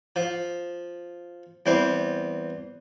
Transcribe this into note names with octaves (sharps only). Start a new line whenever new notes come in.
F3
E2 G3 C4